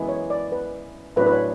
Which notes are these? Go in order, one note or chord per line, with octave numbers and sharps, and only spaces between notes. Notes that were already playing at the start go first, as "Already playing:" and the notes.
Already playing: F#2 E3 G#3 B3 E4
C#5
D5
B4
A1 A2 F#3 B3 D4 B4
B4
C#5